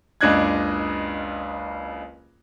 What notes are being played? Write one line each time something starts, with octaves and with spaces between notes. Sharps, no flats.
F#1 C#2 D4 D#5 F#6 G#6